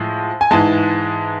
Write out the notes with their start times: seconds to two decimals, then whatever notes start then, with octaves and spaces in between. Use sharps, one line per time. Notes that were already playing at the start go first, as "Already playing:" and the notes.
Already playing: A2 F3 G#3
0.41 G#5
0.51 G#2 E3 G#3 A5